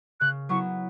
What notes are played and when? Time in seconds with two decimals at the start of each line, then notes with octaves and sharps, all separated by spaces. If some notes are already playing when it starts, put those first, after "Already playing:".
0.20 C#3 F#6
0.49 F#3 B3 E4 C#6